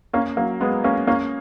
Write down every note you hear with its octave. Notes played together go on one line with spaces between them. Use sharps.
A#3 C#4
F#3 A#3
G#3 B3
A#3 C#4
A#3 C#4